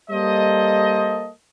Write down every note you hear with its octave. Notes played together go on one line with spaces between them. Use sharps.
G3 A#3 A4 C5 D#5